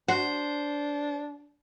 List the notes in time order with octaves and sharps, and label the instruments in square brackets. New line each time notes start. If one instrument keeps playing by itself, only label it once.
[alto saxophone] D4 [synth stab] F#4 [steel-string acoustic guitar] C5